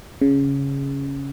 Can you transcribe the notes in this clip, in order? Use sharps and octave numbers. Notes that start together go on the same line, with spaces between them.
C#3